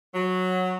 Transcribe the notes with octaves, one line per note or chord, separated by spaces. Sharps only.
F#3